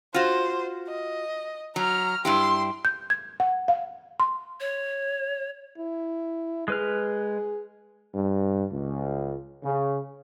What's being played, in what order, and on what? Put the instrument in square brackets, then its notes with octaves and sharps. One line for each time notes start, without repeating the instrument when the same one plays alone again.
[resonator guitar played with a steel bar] F4 F#4 [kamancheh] C5
[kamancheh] D#5
[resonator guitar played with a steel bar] F#3 [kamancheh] A#5 F6
[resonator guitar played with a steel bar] G2 E4 G4 [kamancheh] C6
[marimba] G6
G#6
F#5
F5
C6
[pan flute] C#5
[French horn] E4
[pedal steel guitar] G#3 B4 F6 [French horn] G#4
[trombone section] G2
C#2
C#3